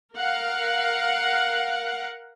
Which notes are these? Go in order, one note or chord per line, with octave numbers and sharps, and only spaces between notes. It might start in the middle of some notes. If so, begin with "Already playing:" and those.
A#4 F5 F#5